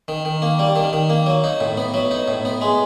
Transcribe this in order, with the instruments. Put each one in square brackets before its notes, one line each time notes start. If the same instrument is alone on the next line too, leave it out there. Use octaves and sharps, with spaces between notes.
[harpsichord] D#3
D#3
A#3
G3
D#3
D#3
A#3
F#3
D#4
A2
B3
F#3
D#4
A2
B3
G#3